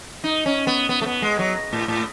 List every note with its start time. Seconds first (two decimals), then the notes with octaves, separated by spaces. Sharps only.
0.24 D#4
0.46 C#4
0.67 B3
0.89 B3
1.02 A3
1.06 B3
1.22 G#3
1.39 F#3
1.73 A2
1.88 A2